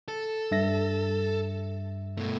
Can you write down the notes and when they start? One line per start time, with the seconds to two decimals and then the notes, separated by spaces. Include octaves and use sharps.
0.08 A4
0.51 G2 E5 A#6
2.18 B2 A3